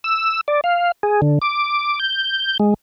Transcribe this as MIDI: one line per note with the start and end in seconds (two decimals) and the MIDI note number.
0.04 0.41 88
0.48 0.61 74
0.64 0.92 77
1.03 1.21 68
1.22 1.39 50
1.42 1.99 86
1.99 2.57 91
2.60 2.74 56